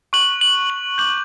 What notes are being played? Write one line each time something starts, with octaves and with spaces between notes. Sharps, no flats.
C#6 F#6 F#7
F#7
F#7
D6 G6 F#7